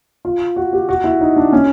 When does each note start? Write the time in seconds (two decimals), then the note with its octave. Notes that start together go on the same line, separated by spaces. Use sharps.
0.25 F4
0.56 F#4
0.73 G4
0.89 F#4
1.04 E4
1.21 D#4
1.36 D4
1.52 C#4